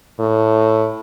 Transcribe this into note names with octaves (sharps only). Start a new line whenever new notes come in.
A2